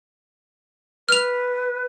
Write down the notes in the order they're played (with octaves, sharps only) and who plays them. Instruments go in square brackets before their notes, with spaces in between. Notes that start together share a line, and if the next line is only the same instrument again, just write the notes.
[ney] B4 [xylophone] F6 F7